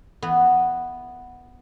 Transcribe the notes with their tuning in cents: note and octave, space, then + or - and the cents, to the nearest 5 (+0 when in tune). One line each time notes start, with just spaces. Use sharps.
E3 +10 B3 +0